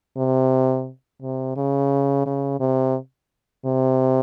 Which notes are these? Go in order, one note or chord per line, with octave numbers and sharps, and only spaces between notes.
C3
C3
C#3
C#3
C3
C3